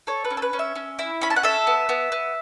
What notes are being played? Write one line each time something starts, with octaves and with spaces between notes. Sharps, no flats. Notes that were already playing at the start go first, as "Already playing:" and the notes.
A4 C#5
B4
C#4
A4
B4
C#4
E5
C#4
E4
C#4 B5
A5
F#5
A4 E5
B3
B3
B3